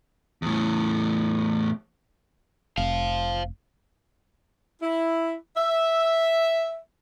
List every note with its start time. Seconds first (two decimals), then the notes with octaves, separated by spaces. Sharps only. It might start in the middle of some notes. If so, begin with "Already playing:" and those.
0.42 E2 A2
2.78 F1 C5 F5
4.82 E4
5.56 E5